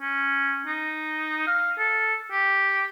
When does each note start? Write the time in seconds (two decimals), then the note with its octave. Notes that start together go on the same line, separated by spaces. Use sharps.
0.01 C#4
0.66 D#4
1.47 F5
1.79 A4
2.32 G4